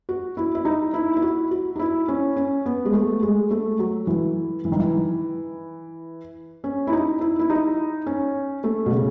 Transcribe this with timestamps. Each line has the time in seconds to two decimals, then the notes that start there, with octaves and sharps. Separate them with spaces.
0.09 F#4
0.37 E4
0.55 E4
0.65 D#4
0.94 E4
1.17 E4
1.22 F#4
1.51 F#4
1.76 D#4
1.79 E4
2.08 C#4
2.36 C#4
2.66 B3
2.85 G#3
2.93 A3
3.22 G#3
3.51 A3
3.79 F#3
4.07 E3
4.65 E3
4.72 D#3
4.80 E3
6.64 C#4
6.87 E4
6.92 D#4
7.21 E4
7.39 E4
7.50 D#4
8.06 C#4
8.64 A3
8.86 B2
8.92 C#3